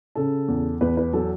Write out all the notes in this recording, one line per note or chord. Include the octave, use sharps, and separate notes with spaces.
C#3 A4
E2
E2 B4
B4
F#3 A4